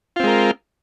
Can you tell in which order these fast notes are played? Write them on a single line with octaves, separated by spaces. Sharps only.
F4 C4 G#3 A#4